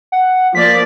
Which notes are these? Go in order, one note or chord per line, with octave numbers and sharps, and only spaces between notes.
F#5
F3 A#3 D5 B6